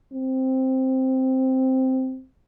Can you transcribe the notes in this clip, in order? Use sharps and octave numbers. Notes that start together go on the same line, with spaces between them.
C4